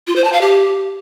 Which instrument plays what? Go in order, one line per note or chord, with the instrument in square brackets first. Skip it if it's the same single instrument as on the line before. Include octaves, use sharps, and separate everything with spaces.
[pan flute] F4
C5
A5
F5
G4